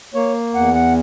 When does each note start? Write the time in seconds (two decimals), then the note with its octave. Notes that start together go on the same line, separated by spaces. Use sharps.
0.14 A#3 C#5
0.55 E2 F#5
0.75 F#5